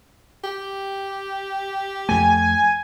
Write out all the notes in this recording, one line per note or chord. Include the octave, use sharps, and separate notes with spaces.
G4
F2 A3 G#5